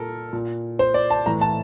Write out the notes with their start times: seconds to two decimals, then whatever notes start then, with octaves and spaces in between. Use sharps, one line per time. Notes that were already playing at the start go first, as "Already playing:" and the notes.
Already playing: A#2 A4 A#4
0.33 A#2
0.79 C5
0.94 D5
1.10 A5
1.26 A2 E3 A#5
1.41 A5